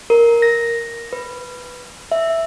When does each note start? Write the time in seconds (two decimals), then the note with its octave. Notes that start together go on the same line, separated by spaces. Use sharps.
0.10 A#4
0.42 A#6
1.13 B4
2.12 E5